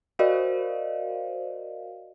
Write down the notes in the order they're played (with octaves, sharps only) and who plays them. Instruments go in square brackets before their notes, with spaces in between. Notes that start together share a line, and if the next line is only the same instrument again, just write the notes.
[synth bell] F#4 A#4 C5 D5 D#5 F5